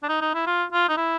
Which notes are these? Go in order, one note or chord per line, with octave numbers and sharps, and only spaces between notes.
D4
D#4
D#4
E4
F4
F4
D#4
E4